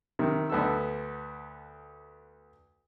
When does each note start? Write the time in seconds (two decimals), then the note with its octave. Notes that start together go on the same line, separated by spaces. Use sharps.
0.19 C3 D#3
0.50 D2 B3 A4 E6